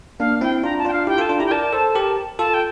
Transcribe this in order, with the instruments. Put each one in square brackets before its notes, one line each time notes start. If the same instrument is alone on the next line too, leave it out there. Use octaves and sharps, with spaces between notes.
[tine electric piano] A#3 D4 [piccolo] F5
[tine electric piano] C4 E4 [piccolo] G5
[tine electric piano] D4 F4 [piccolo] A#5
[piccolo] A5
[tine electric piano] D4 F4 [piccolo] G5
[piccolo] F5
[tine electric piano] E4 G4 [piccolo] G5
[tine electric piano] F4 A4 [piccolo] A5
[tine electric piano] D4 F4
[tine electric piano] E4 G4 [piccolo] A#5
[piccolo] G5
[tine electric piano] A#4 D5 [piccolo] A5
[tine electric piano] A4 C5
G4 A#4
[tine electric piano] F4 A4 [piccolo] A5
[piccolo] G5